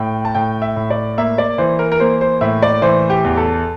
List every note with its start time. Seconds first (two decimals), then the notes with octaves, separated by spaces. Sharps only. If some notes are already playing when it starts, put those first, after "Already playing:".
Already playing: A2 G5
0.25 A5
0.35 A2 G5
0.62 E5
0.76 A2
0.90 D5
1.18 A#3 E5
1.38 D5
1.58 E3 C5
1.79 A#4
1.92 A#4
2.00 A#3 C5
2.21 C5
2.41 A2 E5
2.62 D5
2.82 E3 C5
3.10 G4
3.24 E2
3.37 A4